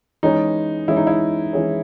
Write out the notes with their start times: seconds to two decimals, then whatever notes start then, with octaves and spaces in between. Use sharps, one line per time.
0.23 E3 G#3 C#4 D#4 G#4 C#5
0.88 E3 G#3 C#4 E4 G#4 C#5
0.97 D#4
1.07 E4
1.53 E3 G#3 C#4 G#4 C#5